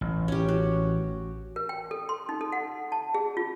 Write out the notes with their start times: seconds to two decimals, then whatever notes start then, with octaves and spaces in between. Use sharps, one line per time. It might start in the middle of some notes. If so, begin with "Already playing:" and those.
0.01 A1
0.28 C#4 G4
0.48 F#4
1.56 A#4
1.69 G5
1.91 A4
2.09 C6
2.29 D#4
2.41 A4
2.52 F#5
2.92 A5
3.14 G#4
3.37 F4